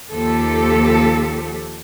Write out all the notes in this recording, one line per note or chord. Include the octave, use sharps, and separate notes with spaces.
D#2 F3 G4 A4